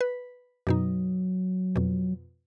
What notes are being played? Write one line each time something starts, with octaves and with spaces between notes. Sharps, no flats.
B4
F#2 B2 F#3 D#4
F2 B2